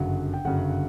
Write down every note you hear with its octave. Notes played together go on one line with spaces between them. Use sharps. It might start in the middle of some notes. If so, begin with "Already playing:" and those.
Already playing: G1 F#2 C#3 F#3 F#5
G5
G1 F#2 C#3 F#3 F#5